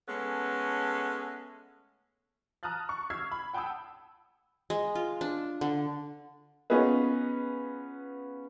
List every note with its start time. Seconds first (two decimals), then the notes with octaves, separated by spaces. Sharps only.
0.08 G#3 A3 B3 C#4 G#4 A4
2.63 A5 A#5 D#6 F6 F#6 A6
2.89 C#6
3.10 E6 F6 G#6 C7
3.32 B5
3.54 F#5 G5 A5 B5 D#6 E6
4.70 G#3
4.95 F4
5.21 D4
5.61 D3
6.70 B3 C#4 D#4 F4 G#4 B4